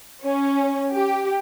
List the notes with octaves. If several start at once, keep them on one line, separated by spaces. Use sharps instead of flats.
C#4
G4